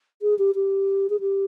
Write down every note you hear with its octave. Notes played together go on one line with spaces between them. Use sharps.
G#4
G4
G4
G#4
G4